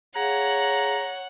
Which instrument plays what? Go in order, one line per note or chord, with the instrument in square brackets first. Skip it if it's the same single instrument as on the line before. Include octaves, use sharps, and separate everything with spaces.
[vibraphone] G#4 F5 [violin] C#5 F#5 [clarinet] A#5